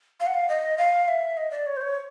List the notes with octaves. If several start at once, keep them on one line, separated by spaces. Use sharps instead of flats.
F5
F#5
F5
D#5
F5
E5
D#5
D5
C#5
C5
C#5